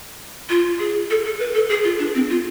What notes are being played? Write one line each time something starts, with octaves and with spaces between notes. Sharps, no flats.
F4
G#4
A4
A4
B4
A4
G#4
F4
D4
C4
F4